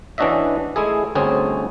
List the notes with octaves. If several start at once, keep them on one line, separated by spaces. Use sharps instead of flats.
E3 C#4 D4 F#4 D#5 E5
G#3 A3 E4 G#4
G1 D2 C4 C#4 G#4